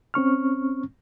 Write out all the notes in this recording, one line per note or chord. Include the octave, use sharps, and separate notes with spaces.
C4 C#4 C#6 F6